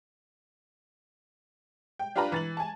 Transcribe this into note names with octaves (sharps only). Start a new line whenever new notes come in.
G5
D4 F4 G4 B4 A#5 B5
E3 A6 F#7
G#5 A5